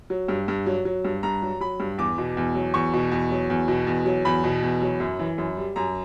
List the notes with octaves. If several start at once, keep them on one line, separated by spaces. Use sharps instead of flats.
F#3
G2
G2
F#3
F#3
G2
G2 A#5
F#3
F#3 B5
G2
E2 D6
B2
E2
F#3
E2 C#6
B2
E2
F#3
E2
B2
E2
F#3
E2 B5
B2
E2
F#3
F#2
E3
F#2
G3
F#2 A#5